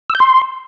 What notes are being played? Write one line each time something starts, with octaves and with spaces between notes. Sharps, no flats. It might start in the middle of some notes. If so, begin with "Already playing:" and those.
E6
G6
C6